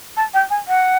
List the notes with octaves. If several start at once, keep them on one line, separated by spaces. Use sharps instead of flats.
A5
G5
G#5
F#5